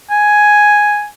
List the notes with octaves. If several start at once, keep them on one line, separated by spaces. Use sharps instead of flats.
G#5